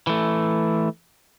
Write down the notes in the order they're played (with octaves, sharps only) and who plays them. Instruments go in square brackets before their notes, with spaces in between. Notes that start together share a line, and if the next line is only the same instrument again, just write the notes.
[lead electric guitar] E3 A3